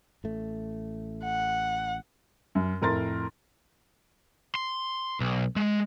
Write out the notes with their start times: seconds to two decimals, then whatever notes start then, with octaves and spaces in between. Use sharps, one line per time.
0.24 A1 A3
1.24 F#5
2.55 F#2
2.81 F2 A2 A#4 C6 A6
4.55 C6
5.20 B1
5.56 G#3